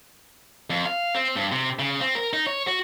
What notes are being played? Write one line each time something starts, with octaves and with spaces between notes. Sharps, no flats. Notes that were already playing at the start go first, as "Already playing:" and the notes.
F2
F5
C4
G2
C3
C#3
C4
A#4
D#4
C#5
F#4